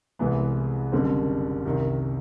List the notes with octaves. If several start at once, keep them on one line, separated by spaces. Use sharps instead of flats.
C2 C3 E3 G#3 B3
F#1 F#2 D3 G3 C4
C2 C3 D#3